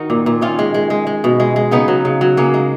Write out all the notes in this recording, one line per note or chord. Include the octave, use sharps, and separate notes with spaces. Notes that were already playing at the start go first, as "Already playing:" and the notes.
Already playing: D#3 D#4 F#4 A#4
A#2
A#2
D#3 C#4 F4
G#3
G#3
G#3
G#3
B2
G#3
G#3
C#3 B3 D#4
F#3
C#3
F#3
C#3 A#3 C#4
G#3